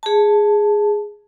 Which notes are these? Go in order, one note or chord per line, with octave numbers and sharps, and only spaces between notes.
G#4 A5